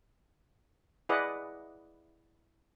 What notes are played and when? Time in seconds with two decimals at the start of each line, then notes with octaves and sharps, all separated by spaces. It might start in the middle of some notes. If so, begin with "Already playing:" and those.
1.09 E4 G#4 B4 D5 D#5 F#5